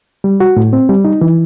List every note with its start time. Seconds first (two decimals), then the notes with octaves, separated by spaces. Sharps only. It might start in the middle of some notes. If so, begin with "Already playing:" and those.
0.24 G3
0.40 F#4
0.57 A2
0.73 C4
0.89 G3
1.05 D#4
1.21 E3